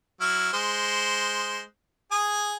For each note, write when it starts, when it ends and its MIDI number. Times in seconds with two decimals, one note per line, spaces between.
0.21 0.53 54
0.21 0.53 64
0.21 0.53 89
0.53 1.62 56
0.53 1.62 72
2.12 2.56 68
2.12 2.56 80
2.12 2.56 87